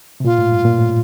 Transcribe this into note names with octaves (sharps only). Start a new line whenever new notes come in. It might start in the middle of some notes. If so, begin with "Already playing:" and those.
C3
A#2 F4
A2
G2
A#2
A2